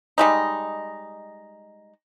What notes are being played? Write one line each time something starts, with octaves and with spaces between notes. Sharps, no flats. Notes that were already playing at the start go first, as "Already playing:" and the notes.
G3 G#3 D#4